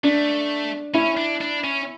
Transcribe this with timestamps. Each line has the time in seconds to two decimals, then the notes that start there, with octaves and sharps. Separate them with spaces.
0.04 A3 D4
0.94 C#4 E4
1.17 D4
1.41 D4
1.64 C#4